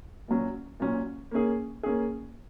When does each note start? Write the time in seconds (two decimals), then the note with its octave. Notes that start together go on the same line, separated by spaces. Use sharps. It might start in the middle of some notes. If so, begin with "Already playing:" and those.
0.28 A#2 F#3 C#4
0.80 A#2 F#3 C#4
1.31 A#3 C#4 G#4
1.83 A#3 C#4 G#4